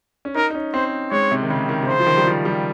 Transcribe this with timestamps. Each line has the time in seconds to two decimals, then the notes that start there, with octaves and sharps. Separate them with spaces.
0.25 C#4
0.35 D#4 A#4
0.50 D#4
0.55 C#4
0.74 C4 C5
1.12 G#3 C#5
1.31 C3
1.43 D#3
1.50 C#3
1.69 D#3
1.83 C3
1.88 C#3 C5
2.00 F3
2.07 D#3
2.17 G3
2.27 F3
2.45 G3